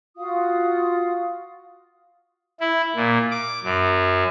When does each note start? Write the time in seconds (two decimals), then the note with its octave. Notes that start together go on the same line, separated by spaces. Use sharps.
0.17 F4 F#4 F5 D#6
2.60 E4
2.95 A#2
3.31 D6
3.64 F#2